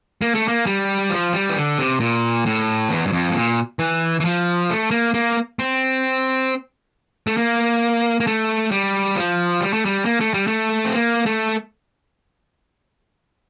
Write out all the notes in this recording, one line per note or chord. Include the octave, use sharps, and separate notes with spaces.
A#3
A3
A#3
G3
F3
G3
E3
D3
C3
A#2
A2
E2
G2
F2
A2
A#2
E3
E3
F3
A3
A#3
A#3
C4
A3
A#3
A#3
A3
G3
F3
G3
A3
G3
A#3
A3
G3
A3
C4
A#3
A3